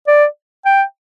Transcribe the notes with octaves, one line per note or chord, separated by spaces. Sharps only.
D5
G5